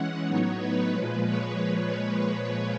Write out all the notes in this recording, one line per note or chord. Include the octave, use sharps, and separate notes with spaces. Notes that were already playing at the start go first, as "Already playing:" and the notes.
Already playing: E3 G#3 C#4 F#5
A2 F#3 B3 D#4 C#5
B4
A#2 F3 G#3
C#5